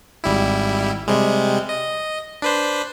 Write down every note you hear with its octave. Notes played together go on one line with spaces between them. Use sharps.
G#1 G3 E4
C3 G3 G#3
D#5
D4 B4 C5